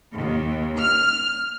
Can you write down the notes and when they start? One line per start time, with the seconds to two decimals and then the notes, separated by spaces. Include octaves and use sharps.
0.14 D#2
0.79 F6